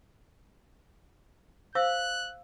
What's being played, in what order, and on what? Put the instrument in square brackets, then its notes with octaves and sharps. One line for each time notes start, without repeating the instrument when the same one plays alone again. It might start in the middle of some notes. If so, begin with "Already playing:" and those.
[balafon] C5 [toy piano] F5 E6 [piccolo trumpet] F#6